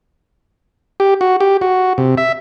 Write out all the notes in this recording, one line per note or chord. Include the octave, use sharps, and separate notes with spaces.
G4
F#4
G4
F#4
C3
E5